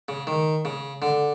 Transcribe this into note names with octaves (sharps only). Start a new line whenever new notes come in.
C#3
D#3
C#3
D3